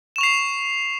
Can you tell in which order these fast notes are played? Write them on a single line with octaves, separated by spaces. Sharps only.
E7 C#6 F7 C7